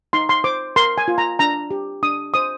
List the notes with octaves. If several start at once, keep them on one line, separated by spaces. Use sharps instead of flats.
D#4 C6
C6
C5 D6
A#4 C6
G#5
F4
A#5
D4 A#5
G4
D4 D#6
C5 D#6